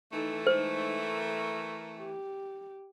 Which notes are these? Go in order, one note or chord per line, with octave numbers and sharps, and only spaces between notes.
E3 A3 D#4 A4
G#3 D#4 C5
A#4
G4